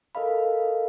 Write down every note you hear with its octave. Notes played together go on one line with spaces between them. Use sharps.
A4 A#4 D#5 F5 B5